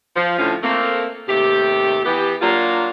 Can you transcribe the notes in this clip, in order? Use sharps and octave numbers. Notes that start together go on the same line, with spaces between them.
F3
A2 D3 F3 A3 C#4 F4
A3 A#3 C4
D#2 C3 A3 G4
E3 B3 G4
F#3 A#3 D4 F4